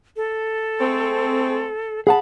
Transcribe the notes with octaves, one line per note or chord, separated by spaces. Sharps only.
A4
G#3 A3 C4
G#4 F#5 A5 B5